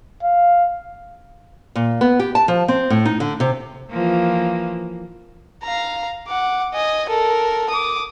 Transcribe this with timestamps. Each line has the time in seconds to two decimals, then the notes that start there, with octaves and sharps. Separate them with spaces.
0.23 F5
1.76 A#2
2.01 B3
2.20 G4
2.35 A5
2.48 F3
2.68 C4
2.90 A2
3.05 D#4
3.20 D3
3.40 C3
3.90 E3 F3 A#3
5.63 F5 A#5
6.28 F#5 D6
6.73 D#5 G#5
7.09 A4 A#4
7.70 D6 D#6